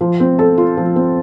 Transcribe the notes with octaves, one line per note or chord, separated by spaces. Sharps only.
F3
C4
A4
F4
F3
C4